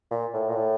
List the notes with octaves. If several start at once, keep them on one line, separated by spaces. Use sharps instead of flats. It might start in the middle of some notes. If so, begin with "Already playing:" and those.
A#2
A2
A#2
A2